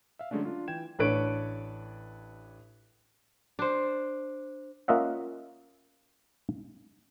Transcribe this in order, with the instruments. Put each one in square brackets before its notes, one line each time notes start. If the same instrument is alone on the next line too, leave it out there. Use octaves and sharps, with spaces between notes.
[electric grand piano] E5 F5
D3 F#3 G#3 A3 C#4 D4
D4 F4
E3 G5 G#6 E7
[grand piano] A1 D4 A4 B4 C#5 D7
[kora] D4 C5
[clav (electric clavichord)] A#3 C#4 F4 D#5 E5 F#5